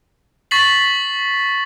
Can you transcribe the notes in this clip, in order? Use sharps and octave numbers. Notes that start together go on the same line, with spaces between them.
C#6 A6 B6 C7 F#7